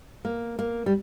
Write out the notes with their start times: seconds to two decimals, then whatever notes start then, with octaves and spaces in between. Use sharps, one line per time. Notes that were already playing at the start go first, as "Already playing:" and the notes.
0.25 A#3
0.59 A#3
0.86 G3